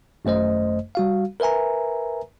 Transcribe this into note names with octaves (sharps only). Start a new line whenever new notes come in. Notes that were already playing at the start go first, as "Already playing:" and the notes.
G#1 F#2 A3 C5 D#5
G3 F#4 F5
A#4 B4 E5 G#5 A#5